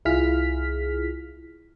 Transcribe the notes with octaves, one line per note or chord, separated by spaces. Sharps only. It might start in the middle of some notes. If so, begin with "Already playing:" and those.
C2 E4 F4 G#4 F6 B6